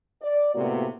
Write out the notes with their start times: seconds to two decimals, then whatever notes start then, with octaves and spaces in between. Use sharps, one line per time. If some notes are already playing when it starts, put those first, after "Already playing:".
0.22 D5
0.55 A2 C3 A#3 B3 F#4